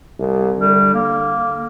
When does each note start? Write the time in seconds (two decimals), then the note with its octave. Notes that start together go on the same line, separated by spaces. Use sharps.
0.19 C2
0.58 D3 G3
0.94 A#3